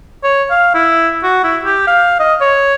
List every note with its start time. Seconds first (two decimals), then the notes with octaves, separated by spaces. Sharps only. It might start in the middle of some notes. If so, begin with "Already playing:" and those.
0.24 C#5
0.51 F5
0.75 E4
1.23 F#4
1.44 E4
1.65 G4
1.87 F5
2.20 D#5
2.41 C#5